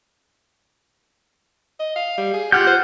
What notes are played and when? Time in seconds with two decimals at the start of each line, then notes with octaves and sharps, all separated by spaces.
1.80 D#5
1.96 F5
2.18 G3
2.34 G#4
2.52 F4 G4 F#5 F6 G6
2.67 C5